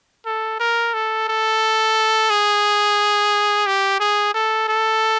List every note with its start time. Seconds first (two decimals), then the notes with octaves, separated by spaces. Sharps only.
0.26 A4
0.60 A#4
0.94 A4
1.28 A4
2.30 G#4
3.66 G4
4.00 G#4
4.34 A4
4.68 A4